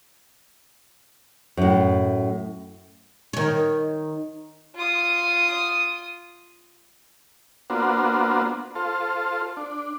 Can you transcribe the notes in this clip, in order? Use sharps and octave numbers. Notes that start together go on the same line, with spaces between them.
F#2 A2
D#3 C#5
F4 D#6
A#3 B3 D4 F4 F#4 C5
F4 A4 C5
D4